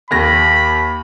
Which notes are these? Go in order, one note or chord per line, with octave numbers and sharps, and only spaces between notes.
D#2 B5 A#6